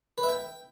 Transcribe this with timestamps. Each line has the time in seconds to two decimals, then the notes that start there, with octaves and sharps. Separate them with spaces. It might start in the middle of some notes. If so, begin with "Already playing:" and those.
0.18 B4
0.23 E5
0.29 G5